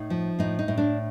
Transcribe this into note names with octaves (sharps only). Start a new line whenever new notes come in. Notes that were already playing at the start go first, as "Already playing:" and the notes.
Already playing: A2 D#4
F3
A2 D#4
D#4
A2
D4